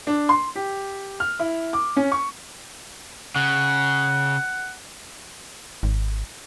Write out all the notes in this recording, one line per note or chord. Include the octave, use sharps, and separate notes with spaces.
D4
C6
G4
F6
E4
D6
C#4
C#6
C#3 F#5
G#1